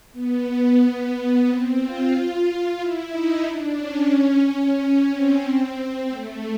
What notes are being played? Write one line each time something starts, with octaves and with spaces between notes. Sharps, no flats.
B3
C4
F4
F4
E4
D#4
D4
C#4
C#4
C4
A3